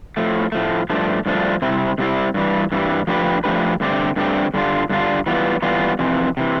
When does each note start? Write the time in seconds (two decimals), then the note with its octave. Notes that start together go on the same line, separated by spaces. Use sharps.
0.17 A2 F3 A3
0.52 A2 F3 A3
0.90 G2 F3 A3 D4
1.26 G2 F3 A3 D4
1.62 C3 G3 C4 E4
1.98 C3 G3 C4 E4
2.34 G2 E3 G3
2.72 G2 E3 G3
3.07 F3 A3 D4 G4 B4
3.44 F3 A3 D4 G4 B4
3.80 G2 D3 A3 C4 G4
4.16 G2 D3 A3 C4 G4
4.54 G2 D3 G3 D4 F4
4.89 G2 D3 G3 D4 F4
5.26 E3 G3 B3 F4
5.62 E3 G3 B3 F4
5.99 F2 C3 E3
6.37 C3 E3